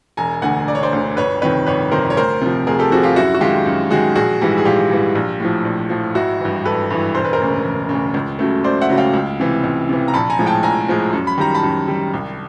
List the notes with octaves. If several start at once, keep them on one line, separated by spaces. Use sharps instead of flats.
E1 G#5 A#5
D2 D3 F#5 G#5
E1 D5
C#5
C5 D5
D2 D3
G1 B4 C#5
F2 C3 D#3 B4 C#5
G1 B4 C#5
F2 C3 D#3 A#4 C5
C#5
D2 A#4 C5
C3 F3
D2 G#4 A#4
G4 A4
C3 F3 F#4 G#4
F4 G4
F#2 E4 F#4
F#4
D#3 G#3 F4 G4
F#2
D#3 G#3 F#4 G#4
A#1 F#4 G#4
G#2 E3 G3
G#4
A#1 F4 G4
G#2 E3 G3
A#1
A2 F3
A#1
A2 F3
G#1 E4 F#4
G2 E3
G#1 A4 B4
G2 E3
E1 C5
B4
A#4 C5
D2 C#3
E1
D2 C#3
C#2
C#3 F#3 A3
C#2 C5 D5
E5 F#5
C#3 F#3 A3
F5 G5
C#2
C3 E3
C#2
C3 E3
A#5
A#1 A5 B5
G#5 A#5
A2 F3 G#3
G5 A5
A#1 G#5 A#5
A2 F3 G#3
F#2
B5
D#3 G3 A#5
A5 B5
F#2
D#3 G3
C2